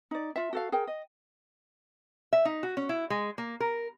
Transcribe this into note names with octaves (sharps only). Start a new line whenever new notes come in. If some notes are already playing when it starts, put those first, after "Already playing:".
D#4 D5
F4 E5
F#4 A4 F5
G#4 A#4 G5
D#5
E5
D#4
F#4
C#4
E4
G#3
A#3
A#4